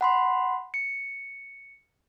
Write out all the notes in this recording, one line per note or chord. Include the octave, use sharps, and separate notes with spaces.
F#5 B5 C6
C#7